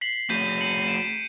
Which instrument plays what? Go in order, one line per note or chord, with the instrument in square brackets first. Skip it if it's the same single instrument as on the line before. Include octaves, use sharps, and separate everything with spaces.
[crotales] B6 C7 F#7
[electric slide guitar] A3 F#4 G#4 [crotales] G6 B6 D#7
[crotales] B6 C#7 F#7
C7 D7 E7